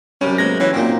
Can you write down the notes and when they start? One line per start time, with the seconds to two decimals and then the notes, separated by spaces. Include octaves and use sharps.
0.21 F#2 C3 G3 C#4
0.38 G#3 A#3 B3 A#6
0.60 E3 C#4 E5 F#5
0.73 F#2 A#2 C4 D#4